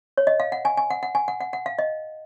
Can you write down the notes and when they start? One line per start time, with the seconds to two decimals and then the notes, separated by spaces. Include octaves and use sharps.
0.18 C#5
0.27 D#5
0.40 F5
0.52 F#5
0.65 G#5
0.77 G#5
0.91 F#5
1.03 F#5
1.15 G#5
1.28 F#5
1.41 F#5
1.53 F#5
1.66 F5
1.79 D#5